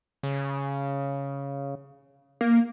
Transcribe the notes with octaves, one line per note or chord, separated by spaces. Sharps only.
C#3
A#3